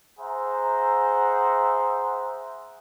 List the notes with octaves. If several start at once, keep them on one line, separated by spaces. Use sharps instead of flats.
G#4 C5 E5 F#5 A#5